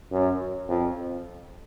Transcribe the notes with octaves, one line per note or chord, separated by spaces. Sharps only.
F#2
F2